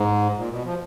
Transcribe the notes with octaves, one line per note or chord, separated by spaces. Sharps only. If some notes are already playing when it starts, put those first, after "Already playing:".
Already playing: G#2
A#2
B2
F3